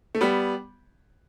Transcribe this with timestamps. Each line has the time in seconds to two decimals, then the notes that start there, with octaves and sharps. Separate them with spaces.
0.15 A3
0.21 G3 B3